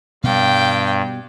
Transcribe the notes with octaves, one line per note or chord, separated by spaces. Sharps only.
G2 B2 G3 F5 G5